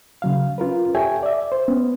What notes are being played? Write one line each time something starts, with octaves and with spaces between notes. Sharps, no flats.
C#3 F#3 F5
C#4 F4 A#4 B4
G4 A4 C#5 E5 G5 G#5
D5 E5
C5
B3 C#4